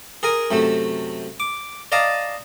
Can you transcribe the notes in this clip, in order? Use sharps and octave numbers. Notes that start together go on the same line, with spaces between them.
G#4 A#4 G#5
F#2 C3 A3
D6
D5 D#5 F5 A5 A#5